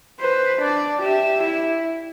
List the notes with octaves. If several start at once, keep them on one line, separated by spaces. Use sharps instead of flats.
B4 C5
D4 D5
G4 E5
E4